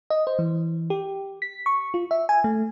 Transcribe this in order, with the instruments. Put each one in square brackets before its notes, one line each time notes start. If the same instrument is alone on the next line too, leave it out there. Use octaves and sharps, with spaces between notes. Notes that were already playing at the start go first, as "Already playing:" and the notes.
[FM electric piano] D#5
C5
E3
G4
B6
C#6
F4
E5
G#5
A3